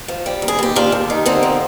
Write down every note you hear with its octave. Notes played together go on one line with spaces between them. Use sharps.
F3
G3
D#2
G#4
D#2 G4
D#2 D4 F4
D#2
D#3
D3 C4 D#4
F3